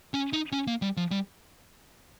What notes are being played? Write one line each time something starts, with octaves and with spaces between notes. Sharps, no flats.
C#4
D#4
C#4
A#3
G3
F3
G3